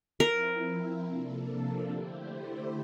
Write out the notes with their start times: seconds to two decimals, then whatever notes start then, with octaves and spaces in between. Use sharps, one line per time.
0.20 F3 C4 E4 A#4
1.05 C3 F3 A#3 D4 A4
1.88 D3 A3 E4 G4 C5